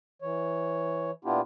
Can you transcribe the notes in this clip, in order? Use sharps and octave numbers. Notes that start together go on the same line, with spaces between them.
E3 C#5
A#2 B3 D4 E4 F4 G4